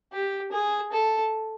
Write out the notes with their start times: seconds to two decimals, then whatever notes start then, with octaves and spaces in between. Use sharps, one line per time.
0.13 G4
0.52 G#4
0.92 A4